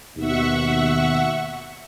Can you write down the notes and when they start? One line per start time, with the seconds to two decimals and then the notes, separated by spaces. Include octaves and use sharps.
0.17 D#2 B2 E5 F#5 C#6